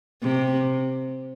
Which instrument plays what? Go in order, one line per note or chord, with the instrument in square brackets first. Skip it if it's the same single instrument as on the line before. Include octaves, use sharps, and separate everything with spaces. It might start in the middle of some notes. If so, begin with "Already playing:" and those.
[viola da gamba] C3